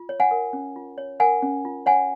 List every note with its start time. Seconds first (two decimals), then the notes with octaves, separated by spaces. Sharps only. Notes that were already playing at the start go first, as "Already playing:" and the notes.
Already playing: F4
0.09 C#5
0.20 F#5 G#5
0.31 A#4
0.53 C#4
0.76 F4
0.98 C#5
1.20 A#4 F#5 G#5
1.42 C#4
1.65 F4
1.86 C#5 F#5 G#5